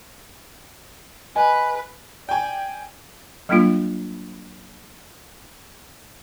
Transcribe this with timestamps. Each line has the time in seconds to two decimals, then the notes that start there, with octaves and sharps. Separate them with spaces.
1.36 B4 D#5 G#5
2.29 D5 G5 G#5
3.49 F#3 G3 A#3 D4 F4